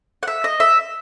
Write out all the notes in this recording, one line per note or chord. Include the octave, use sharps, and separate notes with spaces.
F#5
E5
D#5
E5